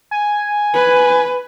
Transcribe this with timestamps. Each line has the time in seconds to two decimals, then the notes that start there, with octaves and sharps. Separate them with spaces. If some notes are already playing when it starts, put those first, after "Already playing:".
0.11 G#5
0.73 B4